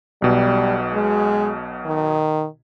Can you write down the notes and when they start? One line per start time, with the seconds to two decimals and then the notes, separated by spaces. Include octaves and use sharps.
0.22 B1 B2 G3
0.93 G#3
1.85 D#3